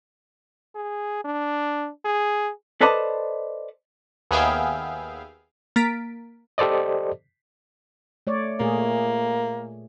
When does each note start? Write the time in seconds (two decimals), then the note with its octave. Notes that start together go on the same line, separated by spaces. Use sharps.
0.75 G#4
1.24 D4
2.05 G#4
2.81 A4 B4 C5 D5 D#5 A5
4.31 D#2 B3 G#4 E5 F5 G5
5.76 A#3 A6 B6 D7
6.58 G4 A4 C5 D5 D#5
8.27 A3 C#5 D5
8.60 A#2 A3 A#3 G#4